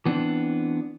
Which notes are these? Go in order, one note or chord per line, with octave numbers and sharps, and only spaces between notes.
E3 B3 C4 D4